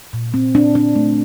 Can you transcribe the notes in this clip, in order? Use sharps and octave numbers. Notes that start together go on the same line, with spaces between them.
A#2
C4
D4
D4
A3